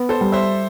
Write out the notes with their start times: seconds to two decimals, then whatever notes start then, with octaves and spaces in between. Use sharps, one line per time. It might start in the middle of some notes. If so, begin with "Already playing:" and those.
Already playing: B3
0.09 A4 C5
0.21 G3
0.32 C5 E5